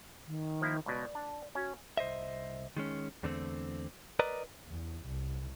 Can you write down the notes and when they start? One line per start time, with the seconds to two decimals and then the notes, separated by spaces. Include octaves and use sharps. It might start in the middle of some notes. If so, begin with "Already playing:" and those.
0.27 D#3
0.61 F3 A#3 E4
0.86 C#2 B2 D5
1.15 D4
1.55 C#4 F#4
1.97 C2 C5 D#5 E5
2.77 D#3 G#3 C#4
3.23 E2 D3 A3 C4
4.19 A#4 B4 D5 D#5 A#5
4.67 E2
5.06 C2